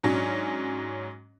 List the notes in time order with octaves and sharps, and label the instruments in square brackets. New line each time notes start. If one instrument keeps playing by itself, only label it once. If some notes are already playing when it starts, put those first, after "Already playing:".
[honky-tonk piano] G#2 F#3 C#4 D4